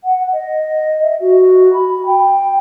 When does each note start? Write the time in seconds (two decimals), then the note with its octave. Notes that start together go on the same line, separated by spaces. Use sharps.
0.04 F#5
0.33 D#5
1.03 E5
1.20 F#4
1.73 B5
2.06 G5